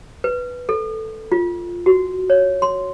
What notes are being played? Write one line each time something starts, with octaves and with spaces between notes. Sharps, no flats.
B4
A4
F4
F#4
C#5
C6